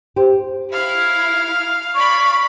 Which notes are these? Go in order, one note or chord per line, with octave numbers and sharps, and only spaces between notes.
G4 C5
E4 F5
D5 B5 C#6